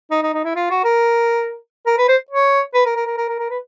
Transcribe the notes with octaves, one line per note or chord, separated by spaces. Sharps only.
D#4
D#4
D#4
E4
F4
F#4
A#4
A#4
B4
C5
C#5
B4
A#4
A#4
A#4
A#4
A#4
A#4
B4